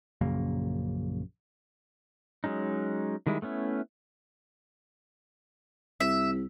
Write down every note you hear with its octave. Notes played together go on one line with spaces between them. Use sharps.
A#1 F#2 C#3 A#3
F#3 G#3 C#4 D#4
D#3 G3 G#3 E4
A3 B3 C#4 E4
C2 E5